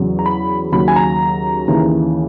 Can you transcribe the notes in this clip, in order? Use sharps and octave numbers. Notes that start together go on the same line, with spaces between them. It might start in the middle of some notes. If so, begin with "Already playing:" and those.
Already playing: E2 C#3 F#3
A#5
B5
D#2 C#3 F#3 B5
G#5
A#5
D#2 C#3 E3